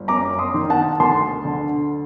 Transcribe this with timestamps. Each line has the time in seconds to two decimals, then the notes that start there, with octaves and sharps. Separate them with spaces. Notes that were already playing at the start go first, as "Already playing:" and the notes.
Already playing: G1
0.08 F#2 A#5 D6
0.39 C6 D#6
0.54 D#3
0.70 F#5 A5
1.00 D2 A5 C6
1.45 D3